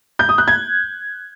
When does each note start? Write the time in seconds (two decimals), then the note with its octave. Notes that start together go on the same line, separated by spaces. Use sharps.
0.19 G6
0.29 D#6
0.38 F#6
0.48 G#6